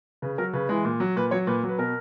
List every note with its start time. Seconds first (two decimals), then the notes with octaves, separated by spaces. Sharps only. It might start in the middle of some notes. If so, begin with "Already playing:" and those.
0.22 C#3 B4
0.38 F#3 A#4
0.53 C#3 B4
0.69 E3 G#3
0.85 A#2
1.00 F#3
1.16 A#2 B4
1.31 F#3 C#5
1.47 A#2 B4
1.63 F#3
1.69 B4
1.78 B2 A#4